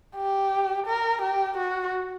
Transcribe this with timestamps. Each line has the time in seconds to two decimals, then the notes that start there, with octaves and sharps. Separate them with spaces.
0.16 G4
0.87 A#4
1.22 G4
1.57 F#4